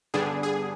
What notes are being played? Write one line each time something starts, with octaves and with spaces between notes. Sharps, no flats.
G2 D3 G3 B3 D4 G#4
G#4